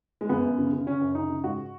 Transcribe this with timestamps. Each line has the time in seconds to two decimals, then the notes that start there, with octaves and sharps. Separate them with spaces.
0.21 G#3
0.29 F#2 B3
0.44 F#2
0.58 C#3
0.73 C#3
0.87 C#3 C#4
1.01 F#2
1.15 C#3 D#4
1.29 C#3
1.44 G#2 F#4